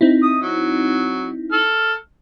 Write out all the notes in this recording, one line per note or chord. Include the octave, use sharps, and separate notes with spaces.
C4 D#4 E4
D#6
F#3
A4 F6